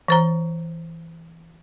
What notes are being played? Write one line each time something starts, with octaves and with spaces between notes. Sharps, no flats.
E3 C5 A#5